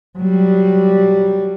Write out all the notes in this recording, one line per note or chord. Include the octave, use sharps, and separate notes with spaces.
F#3 G3